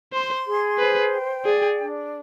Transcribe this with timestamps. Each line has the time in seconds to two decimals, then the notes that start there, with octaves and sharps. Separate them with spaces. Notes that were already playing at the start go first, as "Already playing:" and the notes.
0.13 C5 C6
0.46 G#4
0.78 B4 C5
1.12 G5
1.45 G#4 D5
1.79 D4